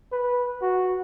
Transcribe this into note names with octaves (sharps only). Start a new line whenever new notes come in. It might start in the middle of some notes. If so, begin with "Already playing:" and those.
B4
F#4